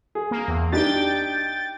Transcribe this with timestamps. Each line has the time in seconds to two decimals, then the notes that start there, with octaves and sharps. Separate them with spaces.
0.15 G#4
0.31 A#3
0.48 E2
0.72 D4 D#4 G4 G5 A6